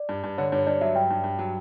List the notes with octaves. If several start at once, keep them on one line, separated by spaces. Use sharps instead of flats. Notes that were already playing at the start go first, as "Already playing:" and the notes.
Already playing: D5
G2
G2
D3 C#5
G2 C#5
G2 D5
F#3 E5
G2 G5
G2
G2
F#3